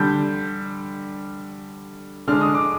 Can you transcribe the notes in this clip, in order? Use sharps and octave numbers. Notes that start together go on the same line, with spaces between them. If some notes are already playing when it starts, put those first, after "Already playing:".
Already playing: D3 G3 D4 G6
D3 G#3 D4 F6
D#6
D6